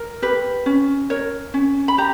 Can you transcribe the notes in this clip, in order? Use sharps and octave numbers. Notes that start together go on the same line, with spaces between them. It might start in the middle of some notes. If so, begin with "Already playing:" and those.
Already playing: A#4
G4 B4
C#4
A#4 C#5
C#4
B5
G4 A#5